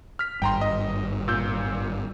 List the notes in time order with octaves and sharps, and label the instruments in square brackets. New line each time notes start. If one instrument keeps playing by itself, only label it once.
[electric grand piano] F6 B6
[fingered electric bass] G#1 G2 [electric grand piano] G5 A#5 C6
[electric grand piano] D#5
A#2 E6 G6